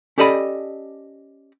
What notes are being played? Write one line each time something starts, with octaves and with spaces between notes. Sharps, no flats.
C#4 G4 A4 D5 D#5 B5